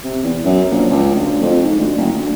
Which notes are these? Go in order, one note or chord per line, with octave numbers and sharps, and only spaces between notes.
C3
E2
F#2
A#1
C#2
D2
F2
G#2
D2
F#1
D2